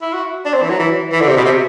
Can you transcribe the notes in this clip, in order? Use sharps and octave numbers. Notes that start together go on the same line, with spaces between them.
E4
F#4
D4
C4
E3
F#3
E3
E3
D3
C3
B2
C3